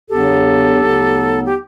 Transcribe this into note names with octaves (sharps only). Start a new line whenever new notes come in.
E2 C#3 F#3 B3 D4 G4 A4
D2 C#3 F#3 B3 D#4
G4